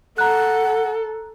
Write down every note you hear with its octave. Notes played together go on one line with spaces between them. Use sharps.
A4 F#5 A#5 F#6